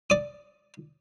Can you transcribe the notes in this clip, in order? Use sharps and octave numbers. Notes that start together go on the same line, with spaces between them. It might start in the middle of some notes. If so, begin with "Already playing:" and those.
D5 D#6